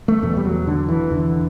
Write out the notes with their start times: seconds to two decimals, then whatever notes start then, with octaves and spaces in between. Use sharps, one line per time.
0.08 A3
0.22 E2 B2 A3
0.37 G3
0.45 F#3
0.67 D3
0.89 E3
1.11 E2 D3